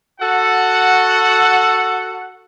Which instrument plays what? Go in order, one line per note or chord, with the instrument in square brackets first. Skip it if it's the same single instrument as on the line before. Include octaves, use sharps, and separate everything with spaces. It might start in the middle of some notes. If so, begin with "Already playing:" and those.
[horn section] F#4 A4 F#5